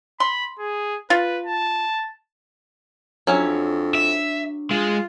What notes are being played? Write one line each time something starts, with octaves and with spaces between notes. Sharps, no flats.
B5 C6
G#4
F4 B4
A5
F2 F#3 C#4 D4 E4
E5
G#3 F4